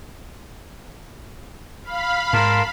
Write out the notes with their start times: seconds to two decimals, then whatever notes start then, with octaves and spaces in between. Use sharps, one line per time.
1.84 F5 B5
2.33 G#2 A#4 A5 C6